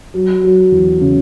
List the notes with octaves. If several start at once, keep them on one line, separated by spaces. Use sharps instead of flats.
F#3
F#3
E2
C#3